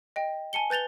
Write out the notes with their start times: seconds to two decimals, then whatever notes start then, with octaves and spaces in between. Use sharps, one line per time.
0.16 D#5 G5
0.53 G#5 A5 C#7 G7
0.70 B4 G6 A6 F7 G7